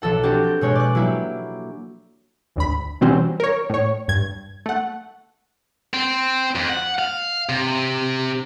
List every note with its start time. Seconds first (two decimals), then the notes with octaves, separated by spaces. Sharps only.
0.02 B1 F3 A4 F#5
0.23 C4 D4 F#4 G4
0.44 G6
0.61 B2 G#3 C#5 F#6 G6
0.75 D5 F#6
0.95 F#3 A#3 E4 G4
2.56 G#1 D2 B5
3.01 B2 E3 F#3 G3 C4 C#4
3.40 A#4 C#5
3.70 A2 C#5
4.08 G2 G#6
4.66 A3 F#5
5.94 C4
6.55 F2
6.70 F#5
6.99 F5
7.49 C3